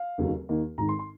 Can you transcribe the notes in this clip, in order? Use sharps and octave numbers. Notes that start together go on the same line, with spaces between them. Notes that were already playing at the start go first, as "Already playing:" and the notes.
Already playing: F5
F1 D#2 C#3 F#3
D#2 D#3 A#3
G#1 G#2 D#3 A#5
C6
C6